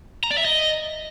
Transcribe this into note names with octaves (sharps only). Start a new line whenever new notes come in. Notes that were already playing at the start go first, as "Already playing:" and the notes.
A#5
D5
E5
D#5